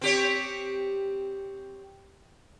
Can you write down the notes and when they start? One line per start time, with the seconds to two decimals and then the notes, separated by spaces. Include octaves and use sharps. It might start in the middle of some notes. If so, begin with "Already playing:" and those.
0.01 C4 G4 C#5